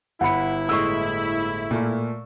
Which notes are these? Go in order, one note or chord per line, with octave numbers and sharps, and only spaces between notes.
G1 E4 F#5 B5 C#7
A2 G#3 C#6 E6
A#2 A3 A#3